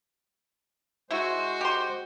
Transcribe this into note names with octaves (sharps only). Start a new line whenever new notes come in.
G#3 E4 F#4 C5
G4 C6